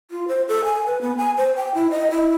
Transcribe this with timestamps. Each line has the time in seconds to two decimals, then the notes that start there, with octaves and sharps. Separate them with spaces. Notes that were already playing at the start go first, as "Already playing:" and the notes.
0.11 F4
0.28 C5
0.48 A4
0.64 G#5
0.86 B4
1.01 B3
1.17 G#5
1.37 C5
1.57 G5
1.74 E4
1.91 D#5
2.11 E4